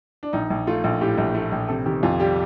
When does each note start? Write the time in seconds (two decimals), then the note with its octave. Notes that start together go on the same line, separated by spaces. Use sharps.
0.23 D4
0.33 A#1 D#4
0.50 A#1
0.67 A3 F4
0.84 A#1
1.01 A2 G4
1.18 A#1
1.34 A3
1.52 A#1
1.69 C3 A4
1.86 D#3 G4
2.03 F2 F4
2.20 G3 G4